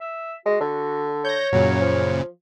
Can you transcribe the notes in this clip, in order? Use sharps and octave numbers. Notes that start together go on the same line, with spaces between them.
E5
G#3 F#4
D3
C#5 G6 A#6
F#2 A#2 C#3 F#3
F3